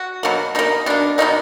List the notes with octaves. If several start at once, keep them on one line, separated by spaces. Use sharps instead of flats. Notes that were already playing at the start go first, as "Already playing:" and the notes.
Already playing: F#4
B2 F#3 A#3
B2 A#3 D#4
B2 A#3 D4
B2 F#3 A#3 D#4